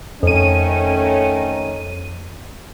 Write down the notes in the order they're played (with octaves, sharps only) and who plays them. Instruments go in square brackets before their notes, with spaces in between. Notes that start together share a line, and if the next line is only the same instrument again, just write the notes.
[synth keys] F2 D#7 [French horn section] D#3 A3 C#4